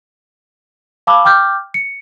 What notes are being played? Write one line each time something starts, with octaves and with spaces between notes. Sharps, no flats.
F5 A5 B5 D6 E6
G5 D6 F6 G6
C#7